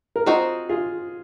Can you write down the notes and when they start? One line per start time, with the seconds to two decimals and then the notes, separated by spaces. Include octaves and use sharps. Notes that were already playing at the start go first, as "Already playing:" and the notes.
0.16 A#4
0.26 C4 D#4 F4 F#4 G#4 C5
0.69 F4 G#4